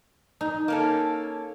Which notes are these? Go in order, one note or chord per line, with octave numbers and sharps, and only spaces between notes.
D#4
A#3 C#4 A4